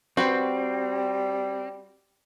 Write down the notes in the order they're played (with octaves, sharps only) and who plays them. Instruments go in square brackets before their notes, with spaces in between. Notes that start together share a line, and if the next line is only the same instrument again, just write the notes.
[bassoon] G3 [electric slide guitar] C4 [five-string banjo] F#4 B4 C5